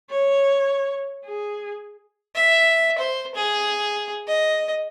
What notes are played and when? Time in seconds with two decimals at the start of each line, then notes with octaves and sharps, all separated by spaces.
0.10 C#5
1.25 G#4
2.35 E5
2.98 C5
3.35 G#4
4.28 D#5